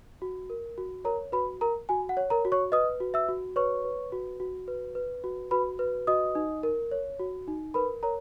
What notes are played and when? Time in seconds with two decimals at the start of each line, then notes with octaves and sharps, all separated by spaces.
0.22 F#4
0.50 A#4
0.78 F#4
1.05 A#4 C#5 A#5
1.32 F#4 B4 B5
1.61 A#4 A#5
1.89 F#4 G#5
2.09 F#5
2.17 C#5
2.30 A#4 A#5
2.45 F#4
2.52 C#5 C#6
2.72 B4 D#5 D#6
3.00 F#4
3.14 E5 E6
3.29 F#4
3.56 B4 C#5 C#6
3.84 B4
4.12 F#4
4.40 F#4
4.68 B4
4.95 B4
5.24 F#4
5.51 F#4 B4 B5
5.79 B4
6.07 F#4 D#5 D#6
6.35 D#4
6.63 A#4
6.91 C#5
7.19 F#4
7.48 D#4
7.74 A#4 B4 B5
8.03 A#4 C#5 A#5